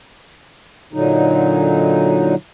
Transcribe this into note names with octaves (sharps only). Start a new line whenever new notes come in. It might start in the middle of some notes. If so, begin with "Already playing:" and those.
A#2 D3 F#3 D#4